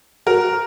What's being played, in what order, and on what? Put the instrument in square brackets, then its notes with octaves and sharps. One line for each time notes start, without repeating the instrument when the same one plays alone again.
[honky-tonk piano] F#4 A#4